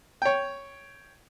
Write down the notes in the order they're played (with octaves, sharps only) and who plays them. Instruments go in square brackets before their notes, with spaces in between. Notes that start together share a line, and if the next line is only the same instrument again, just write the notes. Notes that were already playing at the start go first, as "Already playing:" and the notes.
[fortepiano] C#5 G5